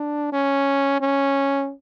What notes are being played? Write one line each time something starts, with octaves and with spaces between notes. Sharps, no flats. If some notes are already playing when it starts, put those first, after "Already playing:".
Already playing: D4
C#4
C#4